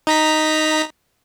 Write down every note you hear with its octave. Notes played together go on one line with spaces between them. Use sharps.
D#4 A#5 B6